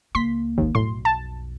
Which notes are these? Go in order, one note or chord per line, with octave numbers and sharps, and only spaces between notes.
C#2 A#3 C6 B6
G#1 D#2
B1 F2 A2 C6
A5